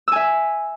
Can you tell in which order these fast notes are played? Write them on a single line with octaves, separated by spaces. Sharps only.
E6 G#5 E5